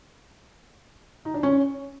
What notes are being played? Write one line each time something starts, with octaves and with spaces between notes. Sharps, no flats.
D#4
D4
C#4